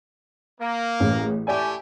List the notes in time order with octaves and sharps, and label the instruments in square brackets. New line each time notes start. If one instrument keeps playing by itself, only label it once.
[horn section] A#3
[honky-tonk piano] A1 C#4 G#4
[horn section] A3 E4 G4 [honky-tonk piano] D5 G#5